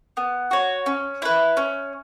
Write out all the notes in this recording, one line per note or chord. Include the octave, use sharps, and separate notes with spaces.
B3
F#4 C#5
C#4
E4 B4
C#4